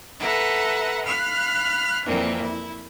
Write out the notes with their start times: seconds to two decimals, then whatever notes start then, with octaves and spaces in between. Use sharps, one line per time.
0.18 A4 B4 E5 F#5 A#5
1.04 F5 B5 F6 F#6
2.05 F2 A#2 E3 A#3 C4
2.42 E4